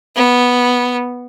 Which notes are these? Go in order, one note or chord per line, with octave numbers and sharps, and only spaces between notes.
B3